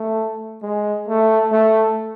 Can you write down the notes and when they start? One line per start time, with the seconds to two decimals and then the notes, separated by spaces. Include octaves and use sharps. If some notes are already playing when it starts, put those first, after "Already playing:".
Already playing: A3
0.62 G#3
1.08 A3
1.52 A3